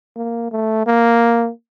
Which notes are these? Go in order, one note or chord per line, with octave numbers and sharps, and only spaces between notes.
A#3
A3
A#3